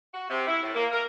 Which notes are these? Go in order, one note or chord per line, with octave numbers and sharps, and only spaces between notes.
F#4
C3
E4
A2
A#3
A#4